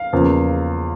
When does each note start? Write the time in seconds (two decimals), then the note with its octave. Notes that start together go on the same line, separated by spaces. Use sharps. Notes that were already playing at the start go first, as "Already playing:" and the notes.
Already playing: F5
0.13 E2 C#3 F3 A#3